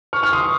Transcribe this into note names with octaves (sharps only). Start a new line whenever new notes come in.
C#6 F6
C#6 F6
C6 D#6